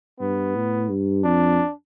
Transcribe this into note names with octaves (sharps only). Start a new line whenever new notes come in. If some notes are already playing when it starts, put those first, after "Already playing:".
G2 B3
A2
G2
F2 D4